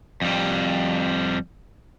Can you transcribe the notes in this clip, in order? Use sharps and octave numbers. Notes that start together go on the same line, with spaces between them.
F2 G3